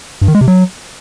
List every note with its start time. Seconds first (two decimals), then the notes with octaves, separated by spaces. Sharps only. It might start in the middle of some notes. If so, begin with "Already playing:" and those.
0.21 G2
0.28 D#3
0.35 G#3
0.41 C3
0.48 F#3